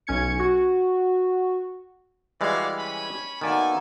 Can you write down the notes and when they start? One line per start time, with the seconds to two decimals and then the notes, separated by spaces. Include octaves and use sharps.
0.07 B1 C#4 G#6 C#7
0.39 F#4
2.41 E3 G3 G#3 F#4 D5 F5
2.77 C#4 G#5 B5
3.41 B2 D#3 A#3 A4 D5 E5 G#5